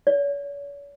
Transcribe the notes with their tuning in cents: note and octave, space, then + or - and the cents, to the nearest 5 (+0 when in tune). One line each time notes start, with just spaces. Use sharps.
C#5 +40